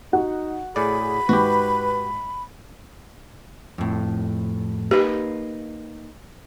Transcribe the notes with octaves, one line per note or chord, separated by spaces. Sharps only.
D#4 F#4 F#5
A2 G#4 D5 B5
G#2 F#4 G4 B4
F2 A2
A#3 D#4 G4 B4